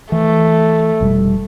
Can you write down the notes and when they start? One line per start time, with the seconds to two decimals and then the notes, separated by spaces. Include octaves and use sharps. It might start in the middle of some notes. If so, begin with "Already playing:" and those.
0.12 E3 A3
1.01 F1 B2 G3